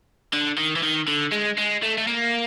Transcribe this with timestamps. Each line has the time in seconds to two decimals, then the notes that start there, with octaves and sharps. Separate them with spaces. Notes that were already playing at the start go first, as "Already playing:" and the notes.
0.33 D3
0.58 D#3
0.76 E3
0.83 D#3
1.08 D3
1.32 G#3
1.58 G#3
1.83 A3
1.98 A3
2.08 A#3